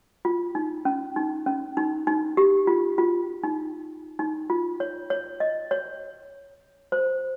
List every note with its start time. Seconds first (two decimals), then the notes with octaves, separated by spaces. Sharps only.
0.25 F4
0.55 D#4
0.85 C#4
1.16 D#4
1.46 C#4
1.77 D#4
2.07 D#4
2.37 G4
2.67 F4
2.98 F4
3.44 D#4
4.19 D#4
4.50 F4
4.80 C#5
5.10 C#5
5.40 D#5
5.71 C#5
6.92 C5